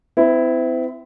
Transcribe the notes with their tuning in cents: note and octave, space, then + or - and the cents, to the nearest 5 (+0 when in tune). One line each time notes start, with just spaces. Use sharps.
C4 -40 E4 +0